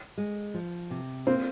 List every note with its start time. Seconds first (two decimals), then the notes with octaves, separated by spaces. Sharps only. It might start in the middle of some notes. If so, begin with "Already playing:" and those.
0.18 G#3
0.54 F3
0.91 C3
1.27 A#3 C4